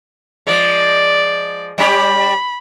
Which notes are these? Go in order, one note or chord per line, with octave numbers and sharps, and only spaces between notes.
F3 G#3 D5
G3 C#4 G4 B5